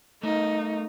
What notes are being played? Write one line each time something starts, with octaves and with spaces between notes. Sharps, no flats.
A3 D#4 A#4